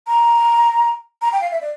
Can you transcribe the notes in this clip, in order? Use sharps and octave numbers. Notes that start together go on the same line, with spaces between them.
A#5
A#5
G5
F5
E5
D5